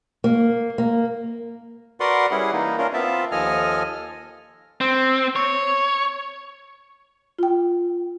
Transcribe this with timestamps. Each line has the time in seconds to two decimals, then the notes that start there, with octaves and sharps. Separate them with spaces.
0.24 A#3
0.78 A#3
2.00 F#4 A#4 B4 D5 F#5 C6
2.31 G3 C#4 E4 G#4 F#5
2.53 E3 A#3 D#4
2.78 A#3 C#4 D4 F4 A#4
2.93 B3 C4 F4 E5 A5
3.31 D#2 F3 A4 D#5 G#5 F6
4.81 C4
5.36 C#5
7.39 F4 G5